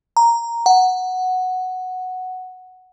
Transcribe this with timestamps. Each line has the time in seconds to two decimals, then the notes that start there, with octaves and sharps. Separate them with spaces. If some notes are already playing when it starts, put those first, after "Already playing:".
0.17 A#5
0.66 F#5